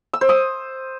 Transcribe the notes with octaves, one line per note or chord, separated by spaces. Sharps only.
E6
C5
D#6